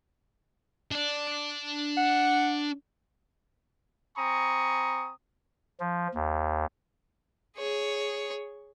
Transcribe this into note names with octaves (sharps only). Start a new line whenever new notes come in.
D4 D5
F#5
C4 G#5 A#5 B5 C#6 D#6
F3
D#2
G#4 C#5